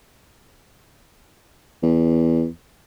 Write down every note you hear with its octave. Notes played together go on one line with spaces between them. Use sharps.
E2